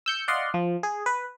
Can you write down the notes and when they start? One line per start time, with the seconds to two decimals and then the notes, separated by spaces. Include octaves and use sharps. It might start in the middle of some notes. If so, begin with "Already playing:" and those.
0.06 E6 G6 C#7
0.28 D5 D#5 F5 F#5 C6
0.54 F3
0.83 G#4
1.06 B4